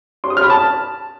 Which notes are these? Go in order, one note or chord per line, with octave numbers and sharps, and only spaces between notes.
C6
D#6
F6
B5
A5